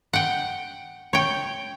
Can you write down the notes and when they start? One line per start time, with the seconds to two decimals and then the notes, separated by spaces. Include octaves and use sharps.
0.13 F#5 G5
1.13 C#5 G5